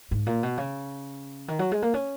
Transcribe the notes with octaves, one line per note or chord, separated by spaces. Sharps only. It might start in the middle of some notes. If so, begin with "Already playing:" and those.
G#2
A#2
B2
C#3
D#3
F#3
G#3
A#3
C#4